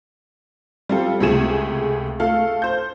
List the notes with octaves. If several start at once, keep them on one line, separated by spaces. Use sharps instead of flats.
G3 C4 F4 A4
C#2 C3 A3 G#4 E7
A3 A4 F5
C5 G6